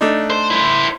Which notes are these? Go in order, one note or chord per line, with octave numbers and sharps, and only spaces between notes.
A3 D4 D#4
C5
E4 C5